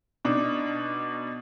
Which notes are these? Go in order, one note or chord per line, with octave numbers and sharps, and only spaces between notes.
B2 D4 D#4